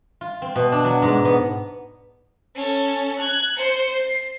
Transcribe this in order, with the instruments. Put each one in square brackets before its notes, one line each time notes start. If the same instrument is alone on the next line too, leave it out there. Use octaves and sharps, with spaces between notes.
[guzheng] F4
C4
B2
D4
F#3
G#2
B3
[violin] C#4 A4
F#6 G#6
C5 C#7
C7